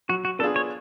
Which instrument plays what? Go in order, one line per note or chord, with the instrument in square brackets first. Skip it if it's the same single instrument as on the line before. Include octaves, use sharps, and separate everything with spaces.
[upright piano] F#3 [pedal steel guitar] F#4
[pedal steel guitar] F#4
[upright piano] B3 D4 F4 G#4 [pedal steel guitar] A4
[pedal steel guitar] C#5